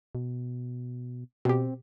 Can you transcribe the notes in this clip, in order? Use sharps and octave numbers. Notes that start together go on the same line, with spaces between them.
B2
B2 C4 G4